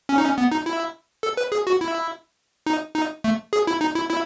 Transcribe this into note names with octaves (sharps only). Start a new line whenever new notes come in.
C#4
D#4
C#4
B3
D#4
E4
A4
B4
G#4
F#4
E4
D#4
D#4
A3
G#4
E4
D#4
E4
E4